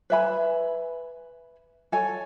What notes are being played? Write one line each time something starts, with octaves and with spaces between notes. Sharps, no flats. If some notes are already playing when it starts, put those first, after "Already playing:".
B4 E5 G#5 B5
A4 C#5 G#5